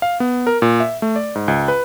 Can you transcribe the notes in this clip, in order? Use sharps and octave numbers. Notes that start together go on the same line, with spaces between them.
F5
B3
A#4
A#2
E5
A3
D5
G#2
C#2
B4